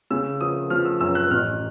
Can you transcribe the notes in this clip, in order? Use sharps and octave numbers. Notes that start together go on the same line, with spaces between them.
C#3 E6
F3 D#6
F3 F6
E6
F#2 E6
F#6
A1 F6